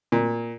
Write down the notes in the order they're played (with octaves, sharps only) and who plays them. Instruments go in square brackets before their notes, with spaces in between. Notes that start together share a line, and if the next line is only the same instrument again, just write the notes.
[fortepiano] A#2